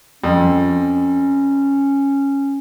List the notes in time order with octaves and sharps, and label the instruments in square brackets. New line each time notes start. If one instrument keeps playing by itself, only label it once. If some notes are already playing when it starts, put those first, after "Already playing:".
[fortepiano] F2 [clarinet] C#4